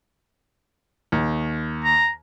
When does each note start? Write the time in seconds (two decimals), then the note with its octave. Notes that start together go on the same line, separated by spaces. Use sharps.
1.12 D#2
1.84 A#5